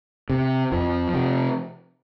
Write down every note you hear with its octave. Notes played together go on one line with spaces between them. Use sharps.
C3
F2 F3
C3